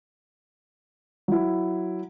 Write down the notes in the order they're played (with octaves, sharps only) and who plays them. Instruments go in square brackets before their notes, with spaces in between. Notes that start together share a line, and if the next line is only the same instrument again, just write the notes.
[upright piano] F#3 E4